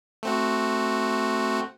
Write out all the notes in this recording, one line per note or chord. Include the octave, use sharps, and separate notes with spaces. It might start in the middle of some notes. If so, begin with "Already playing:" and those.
A3 C4 F#4